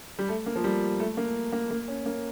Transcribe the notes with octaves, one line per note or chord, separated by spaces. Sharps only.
G3
A3
A#3
F3
G3
A3
A#3
A#3
A#3
C#4
A#3